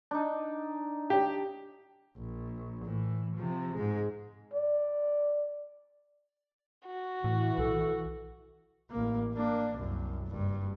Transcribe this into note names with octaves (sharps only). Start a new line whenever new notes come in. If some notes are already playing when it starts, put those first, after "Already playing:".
D4 D#4
G4
A#1
A2 E3
C3 F3
G#2 G#3
D5
F#4
A2 E3
B1 A4
A1 A#3
A#3 D4
C2 F#2
F#1 G2